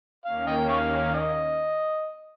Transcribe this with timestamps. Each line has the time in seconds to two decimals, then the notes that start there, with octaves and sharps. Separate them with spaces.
0.25 D#2 D#3 A#3 C#4 F5
0.47 D#5 G5
0.69 C#5 F5
1.14 D#5